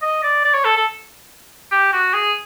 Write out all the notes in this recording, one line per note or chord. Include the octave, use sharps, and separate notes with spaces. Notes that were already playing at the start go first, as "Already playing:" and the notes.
D#5
D5
D5
C#5
A4
A4
G4
F#4
G#4